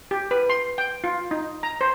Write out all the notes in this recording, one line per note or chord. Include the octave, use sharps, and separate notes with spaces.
G4
B4
C6
G5
F4
D#4
A#5
C5